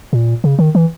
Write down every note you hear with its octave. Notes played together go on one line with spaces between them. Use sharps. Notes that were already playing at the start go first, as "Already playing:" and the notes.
A#2
C#3
D#3
E3